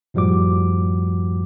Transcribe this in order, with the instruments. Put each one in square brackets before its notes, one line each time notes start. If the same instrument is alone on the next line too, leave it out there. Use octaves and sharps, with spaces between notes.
[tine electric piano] F#2 A2 F3 G3 F#4 D6